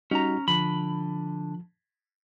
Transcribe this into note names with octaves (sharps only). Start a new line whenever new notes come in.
G3 C#4 D#4 F#4 A#5
D3 F3 B5